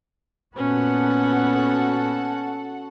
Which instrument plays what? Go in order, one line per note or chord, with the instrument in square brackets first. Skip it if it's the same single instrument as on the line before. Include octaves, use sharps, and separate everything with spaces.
[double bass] A#2 B3 [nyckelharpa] C#4 [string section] F#4 A4 F#5